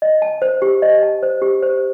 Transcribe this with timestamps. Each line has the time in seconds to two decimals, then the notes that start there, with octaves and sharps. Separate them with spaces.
0.02 D#5
0.22 A5
0.42 C5
0.62 G4
0.82 D#5
1.03 A5
1.23 C5
1.42 G4
1.63 C5